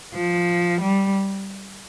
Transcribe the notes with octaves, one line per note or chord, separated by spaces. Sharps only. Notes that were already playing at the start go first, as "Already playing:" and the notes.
F3
G3